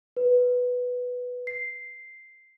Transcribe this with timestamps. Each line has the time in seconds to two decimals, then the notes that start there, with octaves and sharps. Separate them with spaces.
0.17 B4
1.47 C7